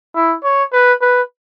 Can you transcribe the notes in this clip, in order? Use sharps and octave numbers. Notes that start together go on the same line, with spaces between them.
E4
C#5
B4
B4